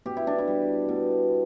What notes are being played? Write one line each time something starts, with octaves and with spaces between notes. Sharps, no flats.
B2 G4
E4
D4
E4
G3
B2